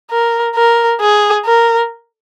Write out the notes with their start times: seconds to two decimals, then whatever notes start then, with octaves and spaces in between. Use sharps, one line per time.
0.11 A#4
0.55 A#4
1.01 G#4
1.45 A#4